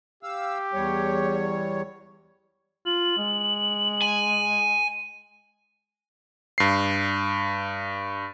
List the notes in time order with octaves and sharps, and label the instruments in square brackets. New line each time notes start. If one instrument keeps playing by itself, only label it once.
[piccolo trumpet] G4 [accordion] F5 E6
[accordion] E2 G3 C#5
[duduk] F4 [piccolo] F#7
[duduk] G#3
[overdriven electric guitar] G#5
[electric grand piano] G2 C7